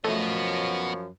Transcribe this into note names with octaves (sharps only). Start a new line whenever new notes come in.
F#2 F3 A3 B3 C#5 D#5